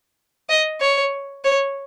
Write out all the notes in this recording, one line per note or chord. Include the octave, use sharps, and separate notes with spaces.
D#5
C#5
C#5